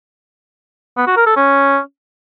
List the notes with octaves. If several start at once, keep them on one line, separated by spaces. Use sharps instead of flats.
B3
F#4
A#4
A4
C#4